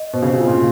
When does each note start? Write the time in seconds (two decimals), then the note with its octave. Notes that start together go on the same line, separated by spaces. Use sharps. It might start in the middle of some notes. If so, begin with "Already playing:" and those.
Already playing: D#5
0.13 B2 C5
0.22 C#3
0.30 C3
0.38 F4
0.47 A#2